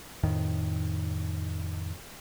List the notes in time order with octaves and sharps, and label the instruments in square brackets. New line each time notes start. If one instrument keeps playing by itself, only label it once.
[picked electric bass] F2 A2 D#3